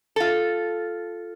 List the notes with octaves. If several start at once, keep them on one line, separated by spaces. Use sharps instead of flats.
F4 A4